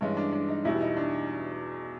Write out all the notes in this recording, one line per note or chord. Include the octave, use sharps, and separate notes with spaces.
G2 E3 G#3 C#4
D4
D4
D#4
E2 B2 G3 E4
D#4
D4